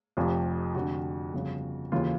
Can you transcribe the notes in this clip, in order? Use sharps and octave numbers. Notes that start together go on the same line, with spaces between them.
F1 F2 C3 F4
F1 F2 D3 F#4
G1 F2 C#3
D#2 C#3 E3 F4